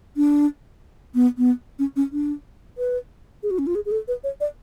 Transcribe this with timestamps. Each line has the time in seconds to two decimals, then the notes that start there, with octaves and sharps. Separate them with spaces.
0.17 D4
1.15 B3
1.38 B3
1.79 C#4
1.96 C#4
2.12 D4
2.78 B4
3.43 G#4
3.51 F#4
3.59 C#4
3.67 F4
3.75 G#4
3.86 G#4
3.91 A4
4.08 B4
4.24 C#5
4.40 D5